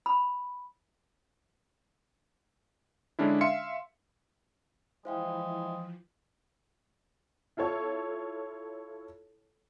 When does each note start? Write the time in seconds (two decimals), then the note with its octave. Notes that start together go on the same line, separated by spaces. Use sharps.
0.06 B5
3.19 D3 G#3 C#4 D4 E4
3.41 E5 F5 C6 C#7
5.05 E3 F3 G#3 E4 C5 F5 G5
7.57 E4 F4 A4 C#5 A5